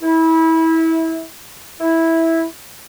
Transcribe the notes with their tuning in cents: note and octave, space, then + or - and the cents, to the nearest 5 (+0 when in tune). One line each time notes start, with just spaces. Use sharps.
E4 -25
E4 -10